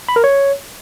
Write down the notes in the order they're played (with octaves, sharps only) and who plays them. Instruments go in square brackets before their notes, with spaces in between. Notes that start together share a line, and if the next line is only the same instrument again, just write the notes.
[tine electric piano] B5
A#4
C#5